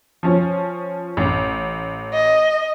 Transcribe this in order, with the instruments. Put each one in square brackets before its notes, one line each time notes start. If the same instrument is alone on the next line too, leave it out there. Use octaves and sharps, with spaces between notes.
[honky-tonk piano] F3 C#4
A1
[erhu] D#5